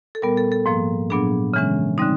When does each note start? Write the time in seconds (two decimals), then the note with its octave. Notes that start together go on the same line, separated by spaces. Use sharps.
0.15 A4
0.22 A#2 G3 B3 A#4
0.38 A4
0.52 A4
0.66 G#2 F3 A#3
1.10 A#2 F#3 B3 D4 G#4
1.54 C#3 E3 G#3 C#4
1.98 D3 G3 C4 D#4